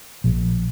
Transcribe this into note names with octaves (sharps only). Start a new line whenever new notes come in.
A#1